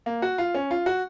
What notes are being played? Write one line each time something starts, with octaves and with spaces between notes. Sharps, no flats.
A#3
F#4
F4
C#4
F4
F#4